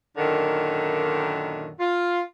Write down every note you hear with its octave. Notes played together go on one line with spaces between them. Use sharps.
F#2 A#2 D3 D#3
F4